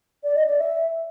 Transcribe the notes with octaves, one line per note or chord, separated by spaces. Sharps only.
D5
D#5
D5
E5